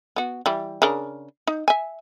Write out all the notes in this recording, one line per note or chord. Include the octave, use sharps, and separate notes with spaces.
B3 F#4
E3 G3
C#3 D4 A#4
D#4
E5 G#5